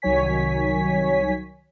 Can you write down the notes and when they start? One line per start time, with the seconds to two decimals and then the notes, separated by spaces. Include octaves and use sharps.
0.02 C2 D#3 F#3 C#5 G#5 B6